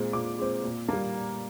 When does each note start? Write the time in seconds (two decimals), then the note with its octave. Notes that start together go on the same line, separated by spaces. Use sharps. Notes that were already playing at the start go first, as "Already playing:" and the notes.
Already playing: A#2 G#3 C4
0.13 A#2 D6
0.39 G#3 C4
0.63 A#2
0.88 G3 A#3